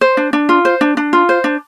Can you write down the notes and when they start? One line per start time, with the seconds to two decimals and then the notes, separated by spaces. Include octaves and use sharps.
0.01 C5
0.17 D4
0.33 D4
0.49 F4
0.65 C5
0.81 D4
0.97 D4
1.13 F4
1.29 C5
1.44 D4